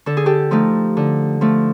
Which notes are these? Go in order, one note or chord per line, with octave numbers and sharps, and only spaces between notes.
D3 A4
G#4
G4 A4
F3 A3 D#4
D3
F3 A3